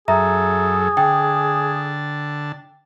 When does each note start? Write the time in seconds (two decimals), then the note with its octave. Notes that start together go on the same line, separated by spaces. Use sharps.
0.08 F#2 G#4 A4 E5 A#5
0.97 D3 G5 A5